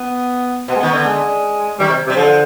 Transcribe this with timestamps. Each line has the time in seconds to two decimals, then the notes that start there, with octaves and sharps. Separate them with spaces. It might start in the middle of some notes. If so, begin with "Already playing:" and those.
Already playing: B3
0.68 B2 B3
0.76 G#3
0.80 D#3 B3
0.93 D3 B3
1.06 G#3
1.79 D#3 G3
1.89 C3
2.07 C3 G3
2.16 D3 F3